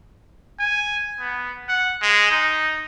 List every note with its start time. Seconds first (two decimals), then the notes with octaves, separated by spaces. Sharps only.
0.60 G#5
1.20 B3
1.69 F#5
2.02 G#3
2.31 D#4